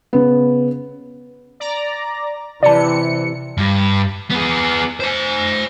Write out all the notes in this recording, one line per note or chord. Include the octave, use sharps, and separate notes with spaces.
C#3 B3
D5 A#5
C3 E3 D5 A5 C#7
G2
B3 G#4
C5 G#5